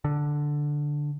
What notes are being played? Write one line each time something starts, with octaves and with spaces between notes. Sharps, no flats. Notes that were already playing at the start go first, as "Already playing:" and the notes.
D3